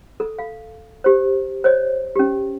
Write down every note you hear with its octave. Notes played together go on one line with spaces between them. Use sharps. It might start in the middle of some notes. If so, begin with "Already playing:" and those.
A4
F5
G4 C5
C5 C#5 D#5
C#4 G4